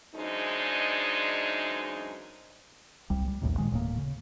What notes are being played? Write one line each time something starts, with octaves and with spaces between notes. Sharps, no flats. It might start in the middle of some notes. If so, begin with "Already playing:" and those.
F#2 E3 G#3 D4 D#4 C5
C2 G3
G3
A#1 D#2 A2 C3
A#2 D#3 F3 G#3
D1 A2 A#3
C#3